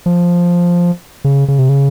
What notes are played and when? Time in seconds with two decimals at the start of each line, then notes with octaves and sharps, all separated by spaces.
0.06 F3
1.24 C#3
1.48 C#3
1.59 C3
1.69 C#3